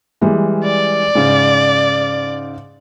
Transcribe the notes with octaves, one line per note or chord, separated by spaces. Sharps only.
E3 G3 G#3
D5
G#2 C#3